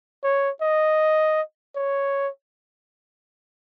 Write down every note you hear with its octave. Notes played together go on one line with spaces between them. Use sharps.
C#5
D#5
C#5